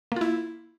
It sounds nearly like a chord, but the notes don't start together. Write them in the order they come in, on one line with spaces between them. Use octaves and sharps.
A#3 F4 E4